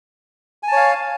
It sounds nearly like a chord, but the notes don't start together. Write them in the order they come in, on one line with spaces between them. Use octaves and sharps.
G#5 A5 C#5 F5